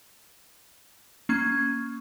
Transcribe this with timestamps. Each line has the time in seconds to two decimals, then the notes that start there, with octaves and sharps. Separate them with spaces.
1.29 A#3 C#4 C#6 G#6